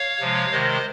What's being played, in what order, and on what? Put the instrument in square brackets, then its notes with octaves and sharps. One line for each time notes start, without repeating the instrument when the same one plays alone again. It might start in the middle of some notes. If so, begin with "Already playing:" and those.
Already playing: [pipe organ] C#5 F5
C3 F3 G#3
C3 D#3 G#3 C5 D#5